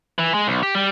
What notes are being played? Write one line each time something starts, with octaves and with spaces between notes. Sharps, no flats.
E3
G#3
B1
G4
G3